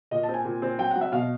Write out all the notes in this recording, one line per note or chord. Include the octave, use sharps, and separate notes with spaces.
A#2 D#5
A5
C4
G#5
A#2
C4
F#3 G5
F#5
F#3
E5
B2 F5